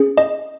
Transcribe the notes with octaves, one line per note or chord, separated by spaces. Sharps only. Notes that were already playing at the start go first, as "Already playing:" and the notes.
Already playing: C#4 G#4
D#5